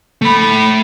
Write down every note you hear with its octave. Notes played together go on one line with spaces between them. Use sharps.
A3 B5